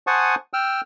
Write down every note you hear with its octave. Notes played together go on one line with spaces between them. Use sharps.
C5 F#5 G#5 A5 C#6 D#6
G5 E6 F6